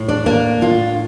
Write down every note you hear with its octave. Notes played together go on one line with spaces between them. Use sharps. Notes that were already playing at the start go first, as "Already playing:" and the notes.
Already playing: A2
D4 D5
A#3 D4 A#4
A2 F4